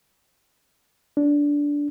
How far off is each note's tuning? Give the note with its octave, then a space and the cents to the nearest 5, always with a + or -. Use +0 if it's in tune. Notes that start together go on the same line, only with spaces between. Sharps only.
D4 -15